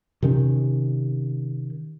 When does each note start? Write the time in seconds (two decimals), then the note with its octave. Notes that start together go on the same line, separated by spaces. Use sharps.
0.22 C3 D#3 C#4